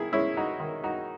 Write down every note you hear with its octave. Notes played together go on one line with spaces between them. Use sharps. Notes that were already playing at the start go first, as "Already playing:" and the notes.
Already playing: D#3 E4 G#4
G#3 C#4 E4
D#4 F#4
D#3
D#4 F#4